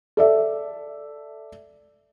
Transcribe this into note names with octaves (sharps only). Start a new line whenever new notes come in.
A4 D5 E5